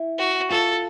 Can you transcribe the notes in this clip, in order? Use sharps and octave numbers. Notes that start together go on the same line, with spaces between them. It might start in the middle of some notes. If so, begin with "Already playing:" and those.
Already playing: E4
F#4
F4 A4